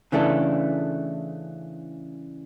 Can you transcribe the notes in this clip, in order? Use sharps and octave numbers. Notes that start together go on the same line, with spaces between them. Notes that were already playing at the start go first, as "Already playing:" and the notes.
C#3 E3 A3 D4 A4